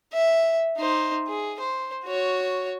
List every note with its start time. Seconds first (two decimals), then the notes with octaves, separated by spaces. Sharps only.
0.13 E5
0.77 D#4 C5
1.27 G#4
1.60 C5
2.05 F#4 C#5